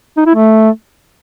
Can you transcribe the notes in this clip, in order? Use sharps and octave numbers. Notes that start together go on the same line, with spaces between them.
D#4
E4
A3